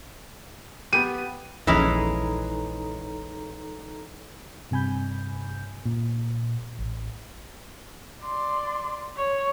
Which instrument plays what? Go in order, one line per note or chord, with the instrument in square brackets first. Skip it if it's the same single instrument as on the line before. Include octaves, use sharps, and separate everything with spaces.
[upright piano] B3 G4 [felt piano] D#7
[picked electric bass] D#1 A#1 [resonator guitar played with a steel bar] E3 G#3 C#4 [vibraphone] D#4 A4 A#5
[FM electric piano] G2 C3 G#5 B5 G6
A#2
A1
[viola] D5 C6
C#5